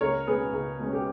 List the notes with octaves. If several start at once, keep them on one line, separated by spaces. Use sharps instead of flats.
C#2 A#4 C#5
B2 G#3 C#4 G#4 B4
C#2
B2 G#3 C#4
G4